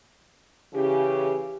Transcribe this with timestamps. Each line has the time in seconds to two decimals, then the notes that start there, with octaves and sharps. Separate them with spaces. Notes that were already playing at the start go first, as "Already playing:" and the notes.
0.74 C#3 E3 G4